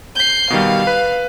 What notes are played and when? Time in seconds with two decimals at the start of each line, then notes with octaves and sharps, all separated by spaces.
0.15 G6 C7
0.50 B2 D#3 G3 F5
0.87 B4